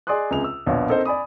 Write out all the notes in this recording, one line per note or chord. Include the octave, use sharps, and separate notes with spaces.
G#4 D5 D#5 C6 D#6 F#6
C#2 C3 G#4 F7
E6
A#1 B2 F4 B4 C#5
C4 D#4 A4 A#4 C5 D#5
D5 G#5 B5 D#6